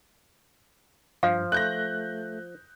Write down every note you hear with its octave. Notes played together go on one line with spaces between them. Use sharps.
G2 F3 F5
A3 F#6 G6 A#6